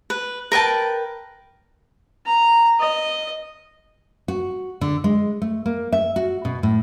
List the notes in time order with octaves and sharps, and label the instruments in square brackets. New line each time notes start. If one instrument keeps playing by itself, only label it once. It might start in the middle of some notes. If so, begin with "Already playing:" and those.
[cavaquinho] B4
A#4 B4 G5 A5
[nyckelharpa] A#5
D#5
[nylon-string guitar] F#4
D3
G#3
A3
A#3
E5
F#4
B2
A2